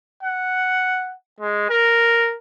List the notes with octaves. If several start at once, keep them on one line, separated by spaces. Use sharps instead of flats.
F#5
G#3
A#4